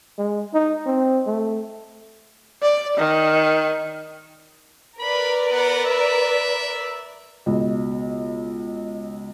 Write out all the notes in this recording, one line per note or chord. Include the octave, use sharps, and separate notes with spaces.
G#3
D#4
C4
A3
D5
D#3
A#4 B4 D5 B5
B3
E5
C#2 B2